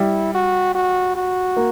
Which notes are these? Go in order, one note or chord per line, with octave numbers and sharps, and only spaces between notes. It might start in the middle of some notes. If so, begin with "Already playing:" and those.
Already playing: G3 E4
F#4
F#4
F#4
A#3